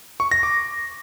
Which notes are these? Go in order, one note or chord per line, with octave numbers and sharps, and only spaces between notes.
C#6
A#6
D6